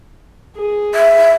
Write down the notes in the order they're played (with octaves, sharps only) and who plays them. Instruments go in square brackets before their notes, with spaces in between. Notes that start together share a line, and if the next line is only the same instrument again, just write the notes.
[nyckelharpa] G#4
[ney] E5